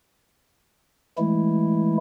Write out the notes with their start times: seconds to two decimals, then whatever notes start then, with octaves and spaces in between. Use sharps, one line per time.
1.18 E3 G#3 A3 E4